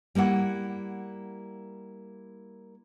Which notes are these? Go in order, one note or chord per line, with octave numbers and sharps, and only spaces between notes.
G3 A#3 E4 F#5